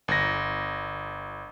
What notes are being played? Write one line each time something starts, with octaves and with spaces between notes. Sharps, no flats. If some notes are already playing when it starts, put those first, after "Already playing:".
G1 A#6